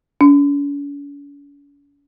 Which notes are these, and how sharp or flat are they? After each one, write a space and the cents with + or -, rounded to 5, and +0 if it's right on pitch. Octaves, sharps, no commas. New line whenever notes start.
C#4 +45